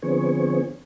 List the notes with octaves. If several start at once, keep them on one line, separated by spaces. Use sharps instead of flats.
D3 F3 B3 C4 G#4 C#5